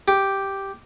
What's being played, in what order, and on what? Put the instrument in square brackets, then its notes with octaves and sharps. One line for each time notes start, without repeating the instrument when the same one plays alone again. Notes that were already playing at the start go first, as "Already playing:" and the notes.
[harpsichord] G4